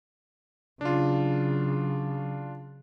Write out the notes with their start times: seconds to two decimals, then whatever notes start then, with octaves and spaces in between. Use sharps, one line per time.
0.81 C#3 F#3 D4 F4